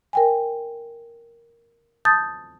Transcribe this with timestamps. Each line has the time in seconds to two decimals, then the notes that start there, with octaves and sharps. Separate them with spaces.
0.13 A#4 G5 G#5
2.05 A5 D#6 G6 A6